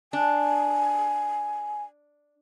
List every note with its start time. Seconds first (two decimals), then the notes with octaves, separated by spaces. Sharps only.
0.13 D4 G#5